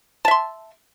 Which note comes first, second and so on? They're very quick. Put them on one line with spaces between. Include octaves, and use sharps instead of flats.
A5 E5 C6